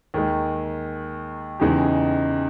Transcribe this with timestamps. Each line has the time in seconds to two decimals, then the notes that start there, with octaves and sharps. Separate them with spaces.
0.14 D#2 D#3 G#3
1.60 E2 C#3 G#3 D#4 G4